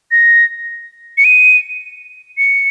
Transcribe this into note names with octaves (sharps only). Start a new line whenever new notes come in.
A#6
C#7
D#7
C#7